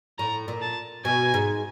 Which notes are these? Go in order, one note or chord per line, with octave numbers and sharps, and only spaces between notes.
A2 A#5
A#2
A5
B2 G#5
G#2